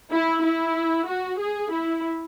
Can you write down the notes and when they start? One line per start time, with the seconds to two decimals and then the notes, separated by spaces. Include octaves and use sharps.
0.11 E4
0.43 E4
1.06 F#4
1.38 G#4
1.71 E4